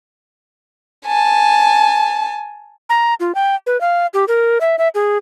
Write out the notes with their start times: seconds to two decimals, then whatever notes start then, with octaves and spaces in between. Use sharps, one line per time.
1.06 G#5 A5
2.89 A#5
3.20 F4
3.35 G5
3.67 B4
3.81 F5
4.14 G4
4.28 A#4
4.61 E5
4.78 E5
4.95 G#4